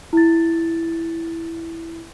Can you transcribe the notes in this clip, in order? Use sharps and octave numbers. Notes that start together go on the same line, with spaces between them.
E4 A6